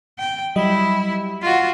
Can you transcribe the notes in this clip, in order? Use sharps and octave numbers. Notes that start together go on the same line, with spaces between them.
G5
F#3 G3 E4 D#5
F4 F#4